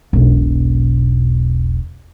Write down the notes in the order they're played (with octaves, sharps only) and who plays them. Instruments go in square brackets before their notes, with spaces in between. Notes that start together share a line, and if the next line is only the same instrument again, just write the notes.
[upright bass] E1 B1